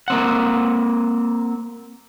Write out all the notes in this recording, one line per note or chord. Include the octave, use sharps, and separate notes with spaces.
A#3 C4 F#5